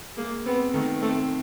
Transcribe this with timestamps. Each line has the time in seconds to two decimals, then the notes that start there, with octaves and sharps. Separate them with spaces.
0.17 G#3 A#3
0.46 B3 C4
0.73 D#3 A3
1.02 A3 C4